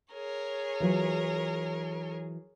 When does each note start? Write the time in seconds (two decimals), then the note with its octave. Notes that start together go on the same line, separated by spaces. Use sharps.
0.13 G#4 A#4 C#5
0.80 E3 F#3 F4